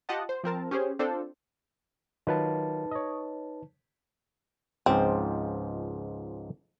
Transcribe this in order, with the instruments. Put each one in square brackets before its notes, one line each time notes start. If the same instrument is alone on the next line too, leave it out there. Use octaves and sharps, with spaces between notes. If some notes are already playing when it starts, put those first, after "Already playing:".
[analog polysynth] F4 G4 D#5 F#5 A5
C5
F3 C4 A#4 A5
C#4 G4 G#4 C5
C4 D4 F4 A4 C5
[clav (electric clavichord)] D#3 F#3 F4 [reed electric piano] D#4 B4 A5
[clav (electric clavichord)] C#5 D#5
[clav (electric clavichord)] C#2 G#2 F3 [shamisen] C4